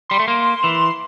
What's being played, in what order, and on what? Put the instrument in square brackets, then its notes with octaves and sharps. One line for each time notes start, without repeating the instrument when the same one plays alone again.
[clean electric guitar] G3 [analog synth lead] C6
[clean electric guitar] A3
A#3
E3